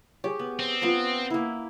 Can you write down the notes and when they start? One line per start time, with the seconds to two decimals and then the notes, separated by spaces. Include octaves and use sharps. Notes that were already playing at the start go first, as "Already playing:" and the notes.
0.24 G4 G#4 C#5
0.39 B3
0.59 C4
0.82 B3 C#4 F4 A#5
1.30 A#3 E4